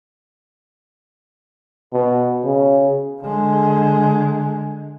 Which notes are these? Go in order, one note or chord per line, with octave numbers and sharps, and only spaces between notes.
B2
C#3
D3 G#3